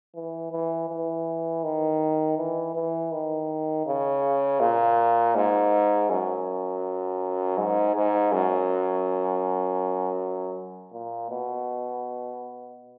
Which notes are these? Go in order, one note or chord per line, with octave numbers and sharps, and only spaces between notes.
E3
E3
E3
D#3
E3
E3
D#3
C#3
A#2
G#2
F#2
G#2
G#2
F#2
A#2
B2